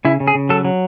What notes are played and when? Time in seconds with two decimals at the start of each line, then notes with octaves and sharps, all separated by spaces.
0.05 C#3 E4
0.20 C#3
0.28 G#4
0.35 C#3
0.49 F#3 A4
0.65 F#3